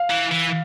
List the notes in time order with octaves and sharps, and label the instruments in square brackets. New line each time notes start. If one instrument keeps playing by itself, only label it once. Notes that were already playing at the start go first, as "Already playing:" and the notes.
Already playing: [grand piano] F5
[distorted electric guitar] E3
E3